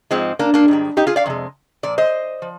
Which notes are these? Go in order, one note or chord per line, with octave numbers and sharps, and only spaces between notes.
G#2 F3 G#3 C4
A#3 D4
A#3 D4
G#2 D#3 G3
D#4 G4
F4 G#4
D5 F5
F2 C3 G#3
A#2 F3 D5
C5 D#5
F3